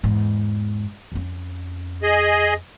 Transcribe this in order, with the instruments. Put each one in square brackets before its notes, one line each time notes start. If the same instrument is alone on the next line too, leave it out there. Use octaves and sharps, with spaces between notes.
[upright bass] E2 G#2
F2 C#4
[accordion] G#4 D#5